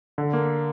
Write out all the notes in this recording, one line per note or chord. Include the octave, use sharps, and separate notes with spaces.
D3
A#3